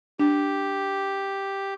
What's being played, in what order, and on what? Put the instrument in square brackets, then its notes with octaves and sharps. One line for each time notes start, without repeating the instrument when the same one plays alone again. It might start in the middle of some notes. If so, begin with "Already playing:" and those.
[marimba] D4 [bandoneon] G4